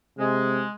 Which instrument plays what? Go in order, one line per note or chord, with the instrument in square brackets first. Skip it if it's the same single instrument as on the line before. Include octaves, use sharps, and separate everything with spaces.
[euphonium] C3 [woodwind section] G#3